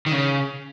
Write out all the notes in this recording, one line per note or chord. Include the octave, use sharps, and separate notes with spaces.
D#3
C#3